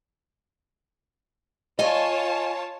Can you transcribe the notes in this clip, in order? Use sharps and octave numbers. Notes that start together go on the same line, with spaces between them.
F4 C#5 D#5 G#5 A5